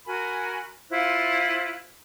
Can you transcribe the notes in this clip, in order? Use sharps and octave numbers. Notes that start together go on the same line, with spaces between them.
F#4 A#4 G#5 B5
E4 F4 C5 F#6